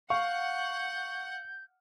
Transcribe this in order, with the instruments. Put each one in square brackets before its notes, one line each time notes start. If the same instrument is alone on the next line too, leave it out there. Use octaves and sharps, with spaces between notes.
[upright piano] F5 [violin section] F#5 [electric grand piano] C#6 [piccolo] G6